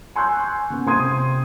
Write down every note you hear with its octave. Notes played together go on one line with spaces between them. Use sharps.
G#5 C6 C#6 E6 F#6 G6
C#3 B3
C3 C4 C6 D#6 G#6 D#7